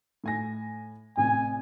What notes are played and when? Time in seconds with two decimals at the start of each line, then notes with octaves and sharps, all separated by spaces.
0.24 A2 G#5 A#6
1.17 A1 C3 G#5